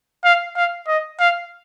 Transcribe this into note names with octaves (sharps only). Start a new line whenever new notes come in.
F5
F5
D#5
F5